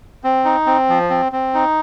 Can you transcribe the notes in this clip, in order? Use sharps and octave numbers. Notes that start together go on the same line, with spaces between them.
C4
D#4
C4
F3
C4
C4
D#4